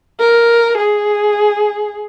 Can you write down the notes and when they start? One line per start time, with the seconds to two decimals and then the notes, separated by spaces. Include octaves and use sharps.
0.20 A#4
0.78 G#4